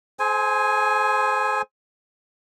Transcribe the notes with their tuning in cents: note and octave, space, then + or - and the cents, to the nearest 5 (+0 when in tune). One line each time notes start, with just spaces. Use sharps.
G#4 +45 C5 +0 G#5 +0